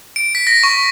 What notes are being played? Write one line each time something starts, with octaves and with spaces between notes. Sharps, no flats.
D7
B6
A#6
C#6